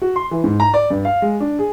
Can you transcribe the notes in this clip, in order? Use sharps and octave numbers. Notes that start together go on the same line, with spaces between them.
F#4
C6
E3
G#2
A#5
D5
G2
F5
G#3
D4
G#4